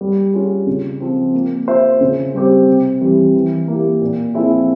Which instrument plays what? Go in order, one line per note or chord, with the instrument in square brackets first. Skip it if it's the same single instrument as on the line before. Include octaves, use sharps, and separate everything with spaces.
[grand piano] G3
C#4 F4 G#4
C#3
F3 C4
A#3
F4 C5 E5
C#3
G3 C4 G4 C5
C3
E3 G3 C4 G4
E3
A#3 E4 G4
A#2
F3 C4 E4 G#4